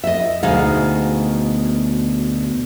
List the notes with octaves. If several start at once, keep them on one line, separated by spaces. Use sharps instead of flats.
D#5 E5
D2 B2 G#3 D#4 F5